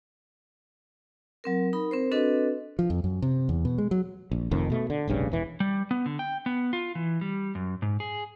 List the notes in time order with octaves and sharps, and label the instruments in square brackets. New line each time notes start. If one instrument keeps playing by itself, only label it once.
[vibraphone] F#3 C4 A#4
D#4 A#4 B5
C4 A#4 C5
C4 D4 F#4 A4 B4 D#5
[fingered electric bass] F3
F2
F#2
C3
E2
B2
G#3
F#3
[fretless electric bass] A#1
F1 F2 D#3
B2 A3
D3
F1 A#1 G2 C#3
E1 E3
[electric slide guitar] G3
B3
D3
G5
B3
F4
E3
G3
F#2
G#2
G#4